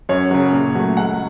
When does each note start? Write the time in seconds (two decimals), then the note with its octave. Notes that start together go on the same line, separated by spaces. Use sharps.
0.09 F#2 C#5
0.31 C#3 F#3
0.53 A#2
0.75 F#3 A3
0.97 C#2 F#5